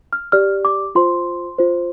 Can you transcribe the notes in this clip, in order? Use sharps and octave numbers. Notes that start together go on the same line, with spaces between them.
F6
G4 D5 F6
D6
F4 C5 C6
F4 C5